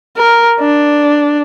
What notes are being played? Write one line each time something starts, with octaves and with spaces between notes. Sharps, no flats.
A#4
D4